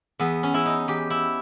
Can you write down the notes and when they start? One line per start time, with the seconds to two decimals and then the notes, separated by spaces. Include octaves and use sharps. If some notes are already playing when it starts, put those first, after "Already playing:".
0.19 E2 B3
0.43 C#4
0.54 E2 E4
0.66 D#4
0.88 E2 G4
1.10 E4